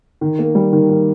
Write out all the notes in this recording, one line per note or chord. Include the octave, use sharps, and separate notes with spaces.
D#3
A#3
G3
D#3
D#3